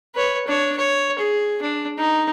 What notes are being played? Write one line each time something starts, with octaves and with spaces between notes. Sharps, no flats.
B4 C#5
D4 C#5
C#5
G#4
D4
D#4